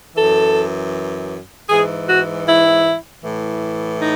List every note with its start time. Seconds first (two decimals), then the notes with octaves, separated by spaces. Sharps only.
0.15 F#2 E3 A4
1.69 G#2 E3 G#4
2.08 F#4
2.45 E4
3.23 A2 E3
3.99 D#4